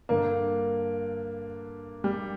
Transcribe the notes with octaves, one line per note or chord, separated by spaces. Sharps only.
G2 D3 A#3
G3